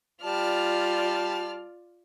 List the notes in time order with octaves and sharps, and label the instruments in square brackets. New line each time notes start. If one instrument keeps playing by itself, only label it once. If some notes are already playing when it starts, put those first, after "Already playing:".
[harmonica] G3 A5 [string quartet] F4 D5 F6